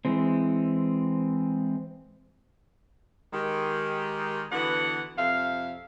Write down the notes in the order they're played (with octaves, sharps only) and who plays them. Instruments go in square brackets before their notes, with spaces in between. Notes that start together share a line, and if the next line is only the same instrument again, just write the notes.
[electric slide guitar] E3 G#3 C4
[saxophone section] D#3 G#3 G4
D3 E3 B3 F#4 B4 F#5
F2 C3 E5 F5